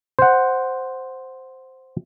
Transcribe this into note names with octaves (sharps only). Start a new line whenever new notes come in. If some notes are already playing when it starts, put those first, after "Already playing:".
C5 F#5